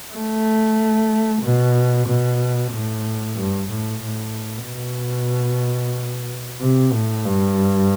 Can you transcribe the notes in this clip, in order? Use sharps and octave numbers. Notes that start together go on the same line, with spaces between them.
A3
B2
B2
A2
G2
A2
A2
B2
C3
A2
G2